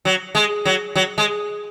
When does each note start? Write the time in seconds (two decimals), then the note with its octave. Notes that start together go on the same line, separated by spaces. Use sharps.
0.05 F#3
0.35 G#3
0.65 F#3
0.95 F#3
1.18 G#3